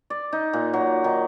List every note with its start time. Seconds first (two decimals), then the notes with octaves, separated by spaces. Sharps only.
0.10 D5
0.33 D#4
0.53 A#2
0.73 F#3
1.04 D#3